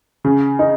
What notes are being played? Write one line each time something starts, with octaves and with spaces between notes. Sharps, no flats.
C#3
D#4